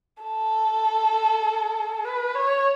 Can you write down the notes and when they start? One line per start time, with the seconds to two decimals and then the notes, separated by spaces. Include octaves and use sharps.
0.23 A4
2.05 B4
2.35 C#5